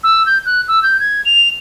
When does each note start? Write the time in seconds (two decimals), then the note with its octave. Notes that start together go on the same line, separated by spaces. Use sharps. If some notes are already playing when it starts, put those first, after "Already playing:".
0.04 E6
0.26 G6
0.46 F#6
0.68 E6
0.83 G6
1.00 G#6
1.25 F7